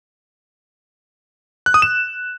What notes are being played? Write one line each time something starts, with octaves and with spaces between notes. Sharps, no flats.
F#6
D#6
E7